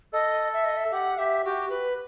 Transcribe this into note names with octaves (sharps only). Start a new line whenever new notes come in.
A4 D#5
E5
D#5
E5
G4 F#5
G4 E5
F#4 G4
B4